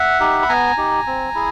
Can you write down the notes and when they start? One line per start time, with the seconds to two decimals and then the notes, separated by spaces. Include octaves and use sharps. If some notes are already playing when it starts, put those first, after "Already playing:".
Already playing: E5 F#5
0.20 D#4 G4
0.42 B5
0.49 B3 G#5 A#5
0.77 D#4 G4
1.06 C4
1.35 E4 G#4